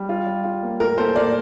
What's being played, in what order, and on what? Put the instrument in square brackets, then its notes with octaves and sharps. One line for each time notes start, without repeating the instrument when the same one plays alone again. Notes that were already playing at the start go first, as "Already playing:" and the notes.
Already playing: [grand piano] G3
F4
G3
F4
A#3
[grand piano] A2 [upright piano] A#4
[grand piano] A#3 [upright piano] A4 C5
[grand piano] A#3 [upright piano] A#4 D5